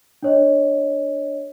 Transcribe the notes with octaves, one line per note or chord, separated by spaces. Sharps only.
D4 C#5 D#5